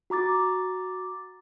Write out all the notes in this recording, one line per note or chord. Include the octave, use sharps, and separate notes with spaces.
F#4 A#5 D6 A6